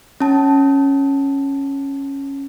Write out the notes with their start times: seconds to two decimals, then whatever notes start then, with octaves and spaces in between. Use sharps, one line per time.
0.20 C#4 A5